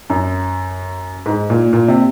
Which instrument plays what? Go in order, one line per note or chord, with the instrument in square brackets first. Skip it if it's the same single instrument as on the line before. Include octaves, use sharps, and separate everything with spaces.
[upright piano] F#2
G#2
A#2
A#2
C3